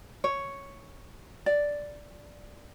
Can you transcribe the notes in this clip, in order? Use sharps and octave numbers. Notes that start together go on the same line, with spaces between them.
C#5
D5